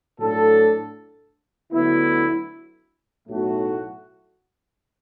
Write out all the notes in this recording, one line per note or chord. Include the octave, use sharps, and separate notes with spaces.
A2 F#3 D4 A4
D2 D3 F#3 B3 E4
B1 A2 F#3 A3 F#4